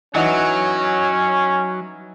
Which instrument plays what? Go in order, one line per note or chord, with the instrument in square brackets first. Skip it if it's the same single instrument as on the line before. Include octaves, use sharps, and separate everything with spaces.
[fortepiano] E3 D#4 F#5 [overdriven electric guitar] F#3 [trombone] C#4